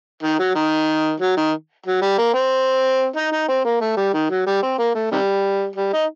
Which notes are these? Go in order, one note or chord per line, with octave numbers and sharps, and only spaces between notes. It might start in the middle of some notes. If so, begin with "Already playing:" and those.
D#3
F#3
D#3
F#3
D#3
F#3
G3
A#3
C4
D#4
D#4
C4
A#3
A3
G3
D#3
F#3
G3
C4
A#3
A3
C3 D#3 G3
G3
D#4